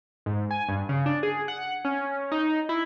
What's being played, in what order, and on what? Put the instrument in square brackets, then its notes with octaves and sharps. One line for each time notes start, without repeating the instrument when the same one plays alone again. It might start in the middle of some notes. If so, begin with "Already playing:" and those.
[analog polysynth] G#2
G#5
G2
C#3
D4
G#4
F#5
C#4
D#4
E4